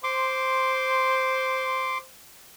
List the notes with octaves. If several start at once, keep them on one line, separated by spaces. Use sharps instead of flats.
C5 C6 D6